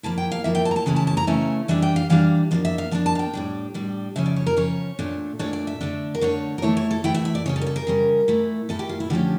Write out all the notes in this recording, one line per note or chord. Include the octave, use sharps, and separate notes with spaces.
F3 A#3 E4 A5
G5
F5
F3 A#3 E4 E5
G5
A5
A#5
A5
C#3 E3 A3 C#4 E4
A5
A5
A#5
C#3 E3 A3 C#4 E4 E5
E3 G3 D4 E5
G5
F5
E3 G3 D4 F5
F3 A#3 D4 F4
E5
F5
F3 A#3 D4 A5
A5
F5
G5
A2 G3 D4
A2 G3 D4
C#3 F3 C#4 E5
D5
C#5
A#4
C#3 F3 C#4 C#5
A#2 A3 D4
A#2 A3 D4 C#5
D5
E5
D3 A3 D4
A#4
D3 A3 D4 C#5
A#4
E3 A3 E4 C#5
C#5
A4
E3 A3 E4 G5
E5
E5
D5
C#3 G3 C#4 C#5
A4
A#4
A4
A#4
C#3 G3 C#4
A#2 A3 E4
A#2 A3 E4 A4
G4
F4
E4
D3 F3 A3 C#4 G4